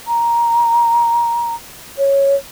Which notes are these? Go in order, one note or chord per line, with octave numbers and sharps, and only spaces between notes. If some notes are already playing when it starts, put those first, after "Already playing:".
A#5
C#5